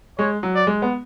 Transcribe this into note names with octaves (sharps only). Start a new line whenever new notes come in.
G#3 C#5
F#3
D5
G#3
B3